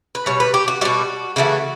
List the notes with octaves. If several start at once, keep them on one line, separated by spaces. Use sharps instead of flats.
B4
B2 G3 C#5
B4
G4
F#4
B2 G3 F#4
C#3 E3 A3 F#4